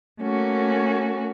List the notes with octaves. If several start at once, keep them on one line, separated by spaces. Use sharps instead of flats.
A3 A#3 C#4 F#4